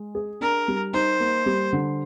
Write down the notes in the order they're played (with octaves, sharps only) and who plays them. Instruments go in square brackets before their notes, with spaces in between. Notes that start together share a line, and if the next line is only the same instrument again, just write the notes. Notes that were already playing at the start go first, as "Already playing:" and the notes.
Already playing: [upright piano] G#3
G#4
[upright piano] D4 [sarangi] A#4
[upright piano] G3
[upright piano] D#4 [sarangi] C5
[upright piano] A#3
G3
D3